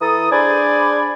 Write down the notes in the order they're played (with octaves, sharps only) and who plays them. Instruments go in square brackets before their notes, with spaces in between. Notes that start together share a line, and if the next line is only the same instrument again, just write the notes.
[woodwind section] E3 A4 A#5 D#6
D4 G#4 C5 D5 G#5 B5